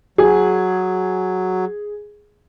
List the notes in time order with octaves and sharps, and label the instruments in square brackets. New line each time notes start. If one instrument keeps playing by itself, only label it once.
[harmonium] F#3 [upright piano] G#4